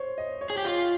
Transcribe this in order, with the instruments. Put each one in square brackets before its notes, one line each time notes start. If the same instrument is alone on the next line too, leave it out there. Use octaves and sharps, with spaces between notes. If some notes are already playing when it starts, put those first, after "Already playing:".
Already playing: [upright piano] C5 C#5
D#5
C#5
[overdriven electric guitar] G#4
G4
F4